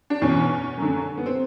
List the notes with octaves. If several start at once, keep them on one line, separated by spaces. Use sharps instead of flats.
D4
E2 B2 C#4
F#2 D3
B3
C4